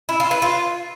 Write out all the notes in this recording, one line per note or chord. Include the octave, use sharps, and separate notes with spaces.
E4
F4
B4
F4